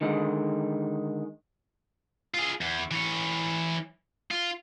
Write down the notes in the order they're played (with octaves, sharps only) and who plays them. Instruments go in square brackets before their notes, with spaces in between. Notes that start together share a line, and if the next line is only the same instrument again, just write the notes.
[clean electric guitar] D3 D#3 G#3
[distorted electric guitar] F4 G#4
E2
E3 C#5
F4